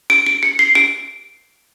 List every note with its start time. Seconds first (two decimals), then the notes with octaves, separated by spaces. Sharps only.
0.10 D7
0.27 D7
0.43 C#7
0.59 C7
0.75 D7